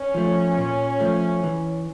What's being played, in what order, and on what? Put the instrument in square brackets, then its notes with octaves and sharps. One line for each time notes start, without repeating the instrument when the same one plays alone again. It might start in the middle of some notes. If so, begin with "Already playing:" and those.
Already playing: [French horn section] C#4
[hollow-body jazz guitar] F3 A3
A#2
F3 A3
E3